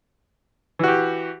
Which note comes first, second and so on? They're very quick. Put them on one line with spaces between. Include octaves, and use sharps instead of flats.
E3 F#4 G4